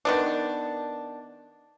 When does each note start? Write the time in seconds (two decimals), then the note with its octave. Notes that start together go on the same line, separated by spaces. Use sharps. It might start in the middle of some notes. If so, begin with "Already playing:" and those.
0.05 D#3 B3 D4